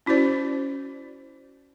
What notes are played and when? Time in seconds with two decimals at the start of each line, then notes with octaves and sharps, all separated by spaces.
0.06 C#4 E4 F#4 C5 D5